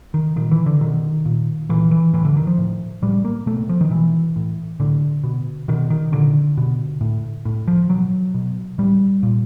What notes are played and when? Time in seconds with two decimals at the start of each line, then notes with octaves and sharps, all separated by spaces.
0.14 D#3
0.36 A#2 D#3
0.51 E3
0.66 D3
0.81 B2 D#3
1.25 A#2
1.69 A#2 E3
1.91 E3
2.13 A2 E3
2.25 D3
2.37 D#3
2.47 F3
2.58 A2
3.02 A2 G3
3.25 A#3
3.46 B2 A3
3.69 F3
3.81 D#3
3.90 B2 E3
4.36 A2
4.80 A2 D3
5.24 B2
5.68 B2 D#3
5.90 D#3
6.12 A#2 D3
6.57 B2
7.01 A2
7.45 A2
7.67 F3
7.89 B2 F#3
8.34 B2
8.78 A2 G3
9.23 A#2